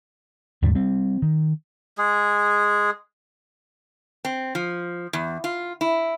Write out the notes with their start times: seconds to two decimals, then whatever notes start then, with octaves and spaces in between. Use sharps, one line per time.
0.62 D#2 G#2 D3 G3
0.75 G3 C4
1.22 D#3
1.98 G#3 G#4
4.25 C4
4.55 F3
5.13 E2
5.44 F4
5.81 E4